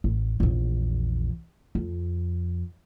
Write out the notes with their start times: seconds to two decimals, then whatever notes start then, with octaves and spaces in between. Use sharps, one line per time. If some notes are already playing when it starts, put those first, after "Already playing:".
0.04 A1
0.40 A#1 E2
1.75 F2